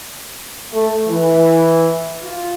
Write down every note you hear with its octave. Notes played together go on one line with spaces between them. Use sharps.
A3
E3
F4